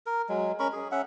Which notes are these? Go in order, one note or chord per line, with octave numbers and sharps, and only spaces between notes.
A#4
F#3 G#3
C#4 A#4 B5 C#6
G#4
C#4 E5 F#5